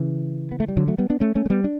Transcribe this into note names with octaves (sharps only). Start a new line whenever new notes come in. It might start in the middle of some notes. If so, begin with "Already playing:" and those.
Already playing: C#3 E3
B3
A3
G3
D3 F#3
F#3 A3
G3 B3
B3 D4
A3 C#4
A3 C#4
A3
G3 B3
D4